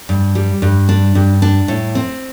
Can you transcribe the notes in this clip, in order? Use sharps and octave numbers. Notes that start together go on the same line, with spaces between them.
G2
G3
G2
D4
G2
D4
A2
C4